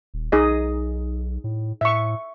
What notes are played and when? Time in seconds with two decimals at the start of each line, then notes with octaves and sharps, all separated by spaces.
0.14 D#1
0.32 B1 D#4 G#4 D#5
1.44 A2
1.81 A2 E5 C#6